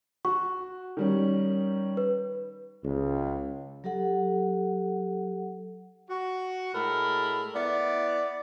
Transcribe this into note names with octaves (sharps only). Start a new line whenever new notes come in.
F#4 C#6
D#3 G3 C#4
B4
C#2
F#3 G4 A4 F#5
F#4
A2 G#3 A4 A#4 B5
B3 E4 D5